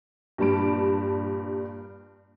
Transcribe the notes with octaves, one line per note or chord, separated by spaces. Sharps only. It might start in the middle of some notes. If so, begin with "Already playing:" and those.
G2 A#2 G3 A5 B5 D7